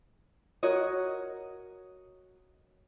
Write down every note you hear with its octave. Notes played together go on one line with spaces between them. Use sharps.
F#4 A#4 C#5 D#5